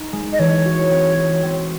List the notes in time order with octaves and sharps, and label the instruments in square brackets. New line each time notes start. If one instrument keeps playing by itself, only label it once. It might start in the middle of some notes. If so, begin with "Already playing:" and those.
Already playing: [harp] D#4
G#3
[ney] D#5
[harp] E3 [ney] C#5
[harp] F#4
C4
F#4
C4